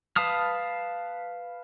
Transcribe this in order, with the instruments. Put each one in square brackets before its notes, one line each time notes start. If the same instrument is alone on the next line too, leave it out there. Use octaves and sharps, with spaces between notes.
[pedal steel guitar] B4 F5 A5 D#6 F6